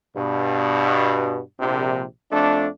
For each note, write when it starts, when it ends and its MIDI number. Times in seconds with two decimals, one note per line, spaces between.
0.16 1.41 43
0.16 1.41 47
1.59 2.03 34
1.59 2.03 48
2.32 2.68 41
2.32 2.68 57
2.32 2.68 62